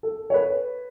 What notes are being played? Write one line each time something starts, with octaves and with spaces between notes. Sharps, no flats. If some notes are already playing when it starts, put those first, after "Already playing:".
A4
C#5
B4